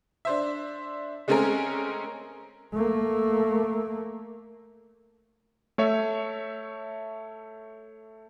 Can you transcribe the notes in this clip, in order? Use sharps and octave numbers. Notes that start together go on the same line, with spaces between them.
D4 C5 E5
G#3 A3 C4 C#4 G#4 A#4
A3 A#3
A3 C#5 E5